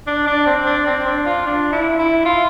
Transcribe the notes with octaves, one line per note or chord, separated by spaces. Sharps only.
D4
D4
C4
D4
C4
D4
F4
D4
E4
E4
F4